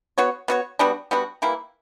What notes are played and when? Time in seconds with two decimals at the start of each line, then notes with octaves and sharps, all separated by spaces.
0.18 B3 F#4 C#5
0.48 B3 F#4 C#5
0.79 G3 B3 D4 F#4
1.11 G3 B3 D4 F#4
1.42 E3 G3 A#3 E4